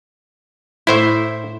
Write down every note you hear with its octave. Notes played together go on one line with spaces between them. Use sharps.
A2 E4 C5 E5